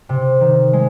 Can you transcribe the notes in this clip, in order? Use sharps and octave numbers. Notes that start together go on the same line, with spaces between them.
C3
D#3
G#3